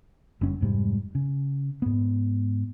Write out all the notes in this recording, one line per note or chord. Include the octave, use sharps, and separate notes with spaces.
F#1 G2 C#4
F1 G#2 G3 G#3
C#3
G#2 B3